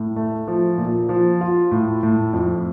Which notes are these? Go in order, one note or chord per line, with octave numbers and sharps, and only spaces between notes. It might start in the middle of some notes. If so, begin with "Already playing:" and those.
Already playing: A2
A3
F3
A#2
F3
F4
A2
A2
F2